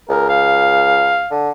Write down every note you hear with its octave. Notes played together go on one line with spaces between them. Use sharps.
C#2 A#4
F5
D3